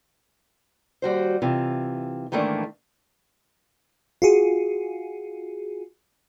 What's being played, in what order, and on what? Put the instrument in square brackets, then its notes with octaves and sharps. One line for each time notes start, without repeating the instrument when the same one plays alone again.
[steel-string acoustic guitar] D#2 G3 F#4 C5
C3 E3 F4
G#2 D#3 E3 A3 A#3 D4
[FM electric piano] F4 F#4 G#4